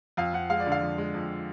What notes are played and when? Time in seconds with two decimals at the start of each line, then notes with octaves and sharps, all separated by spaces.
0.17 F2 F5
0.33 F2 F#5
0.50 G#3 F5
0.60 D5
0.66 D3
0.72 F5
0.82 F2
0.98 G#3
1.14 F2